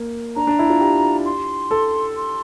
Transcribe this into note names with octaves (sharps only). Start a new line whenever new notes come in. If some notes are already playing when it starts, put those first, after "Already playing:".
Already playing: A#3
D4 A#5
D4
E4
F4
G4
C6
A4
C6